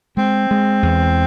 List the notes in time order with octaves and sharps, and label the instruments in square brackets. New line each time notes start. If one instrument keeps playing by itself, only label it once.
[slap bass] G#3 [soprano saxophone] C4
[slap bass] G#3
E2